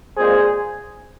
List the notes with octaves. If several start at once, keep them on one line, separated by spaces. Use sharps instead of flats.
A#2 G#3 C4 G#4 C5